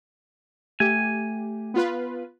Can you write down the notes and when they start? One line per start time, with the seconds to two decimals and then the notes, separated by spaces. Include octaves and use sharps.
0.80 A3 G4 G#5
1.74 B3 F4 B4